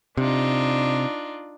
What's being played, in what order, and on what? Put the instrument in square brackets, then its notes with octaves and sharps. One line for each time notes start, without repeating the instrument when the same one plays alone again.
[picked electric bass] C3 [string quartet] D4 D#4 F4